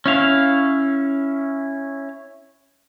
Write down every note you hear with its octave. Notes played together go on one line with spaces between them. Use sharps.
C#4 E4 F5